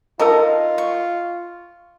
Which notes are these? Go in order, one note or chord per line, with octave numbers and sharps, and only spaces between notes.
D#4 F4 A4 A#4 D#5 A5 A#5
C#6